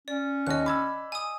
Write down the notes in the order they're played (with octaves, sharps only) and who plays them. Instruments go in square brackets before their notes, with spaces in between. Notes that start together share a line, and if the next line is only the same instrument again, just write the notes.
[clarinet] C#4 [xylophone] D5
[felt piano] D#2 C#5 [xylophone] D#5 F#6
[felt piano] B5 E6 [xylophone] D6 G#6
[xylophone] G#5 D#6